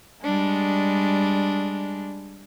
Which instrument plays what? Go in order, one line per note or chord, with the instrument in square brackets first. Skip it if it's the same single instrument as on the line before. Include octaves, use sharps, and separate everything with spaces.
[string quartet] G3 G#3 D4